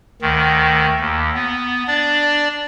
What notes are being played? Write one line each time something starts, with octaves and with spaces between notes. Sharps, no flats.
D2 D#3
D#2
B3
D4 D5